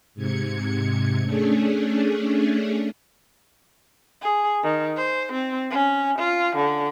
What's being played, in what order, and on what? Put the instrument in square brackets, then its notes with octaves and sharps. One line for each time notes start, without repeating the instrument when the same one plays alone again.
[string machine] G#2 C3 G#6 C#7
A3 C#4 D4 G#4
[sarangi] G#4
D#3
C5
C4
C#4
F4
D3